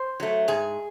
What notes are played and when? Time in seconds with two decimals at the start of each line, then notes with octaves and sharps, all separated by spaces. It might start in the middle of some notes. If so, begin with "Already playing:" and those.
Already playing: C5
0.20 F#3 A3
0.48 G#2 G#4